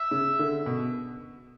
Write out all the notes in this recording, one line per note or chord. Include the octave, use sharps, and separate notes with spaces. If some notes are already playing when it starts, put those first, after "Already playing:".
Already playing: E5
C#3
D3
B2